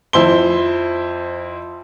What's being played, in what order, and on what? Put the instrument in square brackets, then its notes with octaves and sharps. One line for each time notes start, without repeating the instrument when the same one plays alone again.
[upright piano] F2 E4 C5 C6 G7